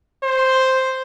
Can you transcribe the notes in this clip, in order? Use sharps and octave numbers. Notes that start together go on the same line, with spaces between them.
C5